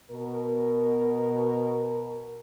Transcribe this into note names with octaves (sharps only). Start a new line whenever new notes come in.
B2 A#4